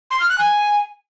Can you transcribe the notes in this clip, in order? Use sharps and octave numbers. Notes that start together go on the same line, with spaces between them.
C6
F6
F#6
G#5